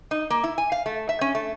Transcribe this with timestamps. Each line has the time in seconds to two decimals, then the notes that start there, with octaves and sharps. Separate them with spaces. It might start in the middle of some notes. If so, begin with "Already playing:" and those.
0.11 D#4
0.30 A#3
0.44 E4
0.58 G#5
0.72 F5
0.86 A3
1.09 E5
1.21 C#4
1.35 A3